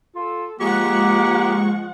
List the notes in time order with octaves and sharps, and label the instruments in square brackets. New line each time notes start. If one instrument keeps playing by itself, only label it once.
[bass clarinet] F4 [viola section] A4
[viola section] F3 F#5 [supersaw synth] G#3 C#6 [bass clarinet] A#3 [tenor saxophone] G4